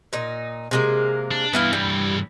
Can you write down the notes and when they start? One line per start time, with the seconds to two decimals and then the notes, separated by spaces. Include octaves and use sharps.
0.13 A#2 D#4
0.71 C3 G#3 A#3
1.31 D4
1.53 G2 E3 B3 E4 F5
1.73 G3